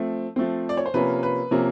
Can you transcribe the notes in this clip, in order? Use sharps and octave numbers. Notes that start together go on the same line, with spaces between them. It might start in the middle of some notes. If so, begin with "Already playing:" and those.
Already playing: F3 A3 C4
F3 A3 C4
D5
C#5
C5
C3 F3 A#3 C#4 B4
B4
C3 F3 A#3 C#4